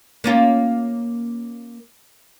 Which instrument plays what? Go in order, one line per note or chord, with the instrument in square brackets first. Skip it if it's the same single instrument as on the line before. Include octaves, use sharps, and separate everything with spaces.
[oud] A#3 C#4 F4